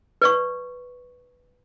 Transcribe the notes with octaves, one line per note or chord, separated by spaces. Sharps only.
B4 D5 C#6